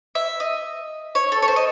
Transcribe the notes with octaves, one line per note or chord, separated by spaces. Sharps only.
E5
D#5
C#5
A4
C#5
C5
D#5